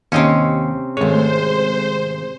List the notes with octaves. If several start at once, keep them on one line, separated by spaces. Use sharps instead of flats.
D#2 C3 C4 C#4 D#5
G#1 G#3 A3 C5 C#5